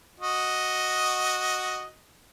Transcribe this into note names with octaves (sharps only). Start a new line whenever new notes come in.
F#4 D#5